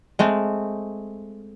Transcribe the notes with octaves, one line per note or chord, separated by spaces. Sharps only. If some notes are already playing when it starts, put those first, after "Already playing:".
G#3 A3 C4